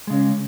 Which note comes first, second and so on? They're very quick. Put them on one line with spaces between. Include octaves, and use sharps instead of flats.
G#3 C#3 C#4